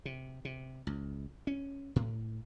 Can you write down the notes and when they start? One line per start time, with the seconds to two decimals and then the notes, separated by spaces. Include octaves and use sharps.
0.05 C3
0.45 C3
0.87 C#2
1.47 C#4
1.96 A2